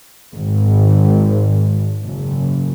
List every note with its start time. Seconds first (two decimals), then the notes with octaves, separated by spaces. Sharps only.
0.33 G#1
2.05 F#1